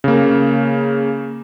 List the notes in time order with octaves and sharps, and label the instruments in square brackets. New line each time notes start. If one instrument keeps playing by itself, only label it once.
[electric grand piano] C#3 A#3